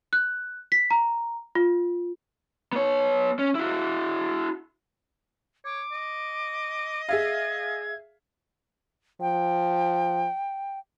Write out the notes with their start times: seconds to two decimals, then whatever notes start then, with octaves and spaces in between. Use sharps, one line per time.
0.13 F#6
0.72 B6
0.90 A#5
1.55 F4
2.73 B3 C#5
3.39 C#4
3.55 E4 F#4
5.65 C#5 D6
5.92 D#5
7.09 G#4 E5 F5 G#6
9.21 F3 G5